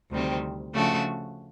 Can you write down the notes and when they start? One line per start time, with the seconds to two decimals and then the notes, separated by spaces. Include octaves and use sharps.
0.10 D2 C3 D#3 G3 C4
0.74 C#3 F3 A3 D4 F#4